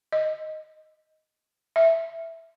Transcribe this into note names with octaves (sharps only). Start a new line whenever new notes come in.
D#5
E5